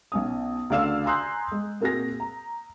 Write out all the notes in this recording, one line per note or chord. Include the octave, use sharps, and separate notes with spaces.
B1 C#4 D#6
D2 C#3 D5 F5 E6 E7
G#5 A#5 C6 D#6 F#6 G6
G#3
A#2 A#3 C4 F#4 G#4 A#6
A#5